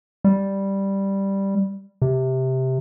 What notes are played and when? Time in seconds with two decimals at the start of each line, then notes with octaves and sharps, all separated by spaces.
0.24 G3
2.02 C3